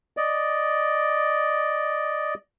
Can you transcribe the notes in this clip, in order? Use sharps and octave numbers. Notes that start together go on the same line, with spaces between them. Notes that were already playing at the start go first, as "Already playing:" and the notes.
D5 D#5